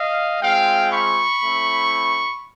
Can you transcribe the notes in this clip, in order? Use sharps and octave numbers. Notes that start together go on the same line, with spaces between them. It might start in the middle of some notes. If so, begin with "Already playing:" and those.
Already playing: D#5 F5
G#3 C4 F4 F5 G5
B5 C#6
A3 C4 E4